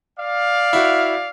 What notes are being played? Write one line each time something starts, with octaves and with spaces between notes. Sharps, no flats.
D5 F5
E4 F#4